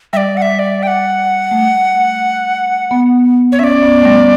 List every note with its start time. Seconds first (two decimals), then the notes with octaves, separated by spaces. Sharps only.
0.13 G3 D5 E5
0.37 F#5
0.42 E5
0.59 D5
0.83 G5
0.87 F#5
1.51 A3
2.91 B3
3.52 C#5
3.59 C#4 D5 E5
3.83 B3
4.02 A3
4.05 G3